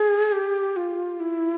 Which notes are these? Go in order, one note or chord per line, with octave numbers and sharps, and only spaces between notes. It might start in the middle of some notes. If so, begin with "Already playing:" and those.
Already playing: G#4
G4
F4
E4